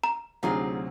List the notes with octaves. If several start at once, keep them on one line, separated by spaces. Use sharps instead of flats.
A#5
D2 C3 F#3 D#4 F4 G#4